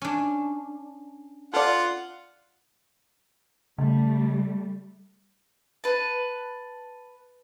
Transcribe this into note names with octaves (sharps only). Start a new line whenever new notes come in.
C#4 D4
F4 A4 D5 F#5
C#3 G3 A3
B4 A5